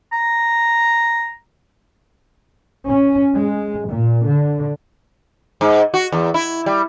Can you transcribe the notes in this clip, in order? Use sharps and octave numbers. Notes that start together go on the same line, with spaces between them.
A#5
C#4
G#3
A#2
D3
G#2
F#4
E2
E4
G3